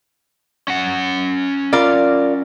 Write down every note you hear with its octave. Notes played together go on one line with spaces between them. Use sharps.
C#4 F#5
F4 A#4 D5